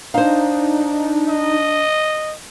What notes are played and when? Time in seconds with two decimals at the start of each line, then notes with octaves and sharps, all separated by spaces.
0.14 D4 D#4 C5 F5
1.29 D#5